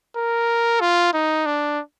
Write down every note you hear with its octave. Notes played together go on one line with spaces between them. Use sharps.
A#4
F4
D#4
D4